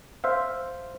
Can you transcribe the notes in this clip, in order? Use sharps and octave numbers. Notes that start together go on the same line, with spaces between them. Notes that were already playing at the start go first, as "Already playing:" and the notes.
C5 E5 F5